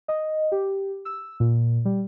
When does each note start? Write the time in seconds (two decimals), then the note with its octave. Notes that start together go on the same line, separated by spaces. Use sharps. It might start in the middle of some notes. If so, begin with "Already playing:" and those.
0.08 D#5
0.52 G4
1.05 E6
1.40 A#2
1.85 G3